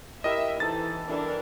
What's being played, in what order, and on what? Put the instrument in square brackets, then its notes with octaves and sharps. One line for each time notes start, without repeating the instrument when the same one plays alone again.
[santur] E4 G4 [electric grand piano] A#4 D#5 [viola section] E5
[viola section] E3 [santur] D#4 A4 C5 [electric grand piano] A6
[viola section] E3 D4 A#4 [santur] E4 A4